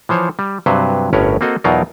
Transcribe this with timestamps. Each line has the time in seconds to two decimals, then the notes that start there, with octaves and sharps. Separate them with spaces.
0.09 E3 F3 C5 C#5
0.39 G3
0.66 G2 C3 F#3 B4 C5
1.13 G1 A2 C#4 A#4 B4 C#5
1.41 A#3 C4 F#4 A4 D#5
1.64 E2 B2 F#3 D#4 F4 A#4